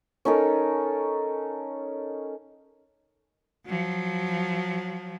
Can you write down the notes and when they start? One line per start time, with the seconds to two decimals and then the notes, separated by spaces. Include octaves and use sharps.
0.25 C#4 D#4 A4 A#4
3.66 F3 F#3